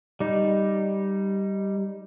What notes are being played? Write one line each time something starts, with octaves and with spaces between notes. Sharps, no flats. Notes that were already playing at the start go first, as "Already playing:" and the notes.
G3 D#4